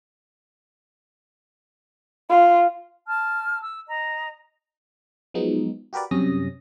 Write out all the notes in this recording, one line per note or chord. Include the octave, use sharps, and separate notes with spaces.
F4
A5 F6
E6
D#5 A#5
F3 F#3 G#3 B3 D#4
F#4 G4 A#4 B4 D5
F#2 C3 G3 C#4 D#6 A#6